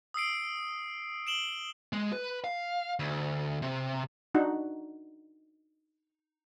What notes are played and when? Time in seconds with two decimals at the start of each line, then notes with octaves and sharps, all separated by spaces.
0.14 D#6 E6 C7 D7
1.27 D7 E7 F#7 G7
1.93 G#3
2.13 B4
2.44 F5
2.99 D2
3.62 C3
4.35 D4 D#4 F#4 F#5